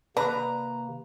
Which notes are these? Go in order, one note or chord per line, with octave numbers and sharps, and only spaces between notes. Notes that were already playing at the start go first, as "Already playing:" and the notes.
C3 D#3 A#3 D4 B4 A#5